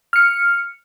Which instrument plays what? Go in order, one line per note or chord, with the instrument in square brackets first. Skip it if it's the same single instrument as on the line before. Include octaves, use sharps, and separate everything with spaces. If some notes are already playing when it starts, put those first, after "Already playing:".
[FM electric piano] F6 C#7